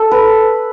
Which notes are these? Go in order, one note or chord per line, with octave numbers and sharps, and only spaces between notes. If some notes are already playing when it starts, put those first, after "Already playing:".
Already playing: A4
B4